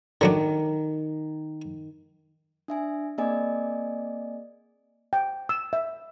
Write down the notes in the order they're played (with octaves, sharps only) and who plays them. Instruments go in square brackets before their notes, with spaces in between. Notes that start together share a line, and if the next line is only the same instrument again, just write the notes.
[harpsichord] D3 F#3 D4 [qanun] D#3
[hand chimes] D4 E5 G#5
A#3 C4 G#4 D5 D#5 G#5
[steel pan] G5
E6
E5